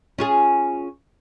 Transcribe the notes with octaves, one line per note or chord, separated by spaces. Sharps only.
C#4 F4 G#4